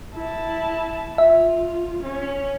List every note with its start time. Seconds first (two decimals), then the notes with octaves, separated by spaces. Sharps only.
0.14 E4 A5
1.18 F4 E5
2.03 C#4